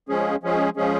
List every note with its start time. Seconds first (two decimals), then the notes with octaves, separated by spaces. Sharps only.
0.09 F3 G#3 C#4 G#4
0.43 F3 G#3 C#4 G#4
0.76 F3 G#3 C#4 G#4